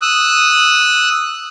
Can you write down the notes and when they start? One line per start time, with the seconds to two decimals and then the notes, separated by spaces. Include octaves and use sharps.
0.02 D#6 E6 F#6